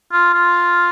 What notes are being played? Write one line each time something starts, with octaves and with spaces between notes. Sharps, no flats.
F4
F4